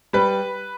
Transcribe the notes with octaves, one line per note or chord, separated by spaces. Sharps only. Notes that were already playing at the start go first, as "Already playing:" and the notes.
G3 B4